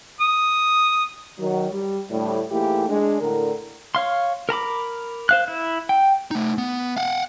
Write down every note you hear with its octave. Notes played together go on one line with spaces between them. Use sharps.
D#6
D#3 F#3
G3
D2 A2 G3
G#2 E3 A3 A#3 E4 G4
G#3 D4
A2 D3 A#4
C#5 F5 C6
A#4 A#5 B5 D6
C5 F5 F#6
E4
G5
A3 D#4
B3
F5 F#5